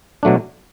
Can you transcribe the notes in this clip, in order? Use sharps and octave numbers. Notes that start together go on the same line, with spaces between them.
B2 F#3 A3 D4